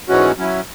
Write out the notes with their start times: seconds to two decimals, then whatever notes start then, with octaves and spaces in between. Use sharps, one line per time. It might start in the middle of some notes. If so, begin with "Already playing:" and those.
0.09 G#2 E3 G#3 C#4 F#4
0.38 F#3 C#4 E4